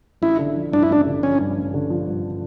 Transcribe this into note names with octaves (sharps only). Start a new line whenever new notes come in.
A1 E4
D3
F3
G2 D4
E4
A1 D4
D3
F3 C#4
G2
A1
D3
F3
G2